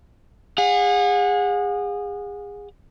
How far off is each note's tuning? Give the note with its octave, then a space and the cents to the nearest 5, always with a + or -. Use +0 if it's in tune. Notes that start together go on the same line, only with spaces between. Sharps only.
G#4 -30 F#5 -40